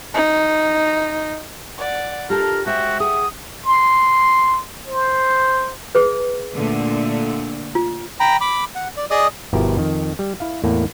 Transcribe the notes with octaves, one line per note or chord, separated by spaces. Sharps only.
D#4
D5 F#5
D4 F4 G4 A4 A#4
G#3 F#4 G4 C5 E5 G5
G#4 F#5 D#6
C6
C5
G#4 B4
A#2 D3 A3
F4
G5 A#5 B5
B5 D6
F#5
D5
G#4 D5 D#5 D#6
G1 B2 F3 E4 G4 A#4
F2 D#3
G3
E4 F5
E2 A2 A#3